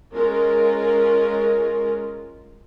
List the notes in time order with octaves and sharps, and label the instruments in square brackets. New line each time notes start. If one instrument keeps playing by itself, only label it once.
[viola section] G#3 C#4 F4 A#4